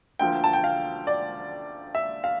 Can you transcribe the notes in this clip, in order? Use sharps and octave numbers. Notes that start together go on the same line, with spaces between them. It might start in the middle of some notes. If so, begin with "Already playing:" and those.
D2 D3 F3 A#3 G5
A5
G5
F5
D5
E5
F5